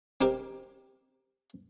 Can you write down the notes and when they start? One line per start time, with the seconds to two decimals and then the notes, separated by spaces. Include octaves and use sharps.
0.21 C4 D#4 G4 A#4